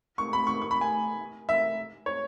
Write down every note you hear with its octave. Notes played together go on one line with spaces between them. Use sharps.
C#6
B5
C#6
C#6
B5
G#5
E5
C#5